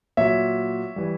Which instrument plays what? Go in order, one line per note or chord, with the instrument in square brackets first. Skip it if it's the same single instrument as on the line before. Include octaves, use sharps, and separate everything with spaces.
[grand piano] A#2 F#3 C#5 E5
E3 G3